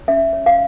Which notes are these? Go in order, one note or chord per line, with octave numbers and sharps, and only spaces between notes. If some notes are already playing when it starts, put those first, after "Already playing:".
Already playing: C#5
C#4 E5
C#5
F5